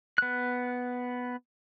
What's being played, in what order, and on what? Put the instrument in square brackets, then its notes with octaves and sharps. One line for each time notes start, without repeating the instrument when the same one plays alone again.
[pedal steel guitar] B3 F#6